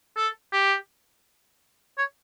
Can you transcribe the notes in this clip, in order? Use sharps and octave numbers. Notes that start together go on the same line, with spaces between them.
A4
G4
C#5